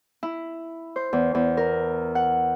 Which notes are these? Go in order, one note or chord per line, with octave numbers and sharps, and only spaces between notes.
E4
C5
E2
E2
A#4
F#5